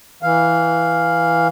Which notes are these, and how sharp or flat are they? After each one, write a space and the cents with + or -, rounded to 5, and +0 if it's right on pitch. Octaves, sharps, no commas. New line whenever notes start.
E3 +0 F5 +0